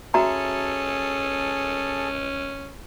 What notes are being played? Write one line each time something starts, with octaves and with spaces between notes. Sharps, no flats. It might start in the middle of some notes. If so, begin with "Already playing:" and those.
C#4 F#4 G#4 A4 E5 A5 A#5